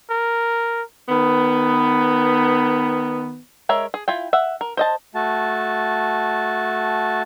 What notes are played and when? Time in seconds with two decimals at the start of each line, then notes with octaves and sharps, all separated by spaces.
0.10 A#4
1.09 D#3 B3
3.69 G#3 A#4 C#5 E5
3.94 G#4
4.08 E4 F4 G5
4.33 E5 F#5
4.61 A#4
4.77 C5 D#5 A5
5.15 A3 F#4 A5